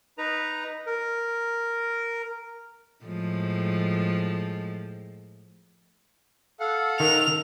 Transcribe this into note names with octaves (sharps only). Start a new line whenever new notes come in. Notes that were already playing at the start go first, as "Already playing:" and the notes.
D#4 B4 A#5
A#4
A2 F3 G#3
A4 F5 F#5
D#3 F7